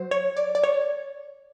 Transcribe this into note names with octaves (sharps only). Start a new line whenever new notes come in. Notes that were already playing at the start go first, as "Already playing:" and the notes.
Already playing: F#3 C5
C#5
D5
D5
C#5